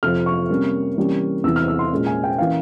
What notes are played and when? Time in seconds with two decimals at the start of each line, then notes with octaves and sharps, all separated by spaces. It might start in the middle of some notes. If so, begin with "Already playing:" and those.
0.03 F2 C3 F3 F6
0.26 C#6
0.50 C3 G3 A#3 C#4
0.97 C3 E3 G3 A#3 C#4
1.44 E2 C3 E3 E6
1.56 F6
1.68 E6
1.79 C6
1.91 A#2 G#3 C#4
2.07 G#5
2.24 G5
2.38 E3 A#3 C#4 F5